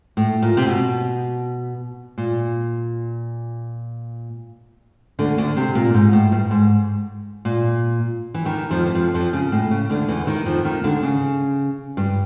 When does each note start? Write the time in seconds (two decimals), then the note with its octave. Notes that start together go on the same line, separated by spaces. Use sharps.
0.17 A2
0.42 A#2
0.57 C3
0.67 B2
2.18 A#2
5.19 D2 D3
5.38 D2 D3
5.57 C3
5.75 A#2
5.94 G#2
6.13 A2
6.32 G2
6.51 G#2
7.45 A#2
8.34 E3
8.45 D#2 D#3
8.71 F2 F3
8.86 E3
8.95 F2 F3
9.14 F2 F3
9.33 C#3
9.52 A2
9.71 C#3
9.90 D2 D3
10.08 E2 E3
10.27 D#2 D#3
10.46 F2 F3
10.65 D#2 D#3
10.84 D2 D3
11.03 C#3
11.97 G2